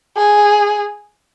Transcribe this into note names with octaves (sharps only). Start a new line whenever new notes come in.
G#4